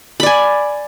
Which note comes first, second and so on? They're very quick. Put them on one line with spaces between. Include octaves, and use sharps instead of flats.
B5 D5 G#5